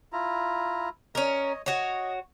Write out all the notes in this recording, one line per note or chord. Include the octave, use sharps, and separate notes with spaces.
E4 F4 A#5
C#4 A#4 C#5 D#5
F#4 C#5 D#5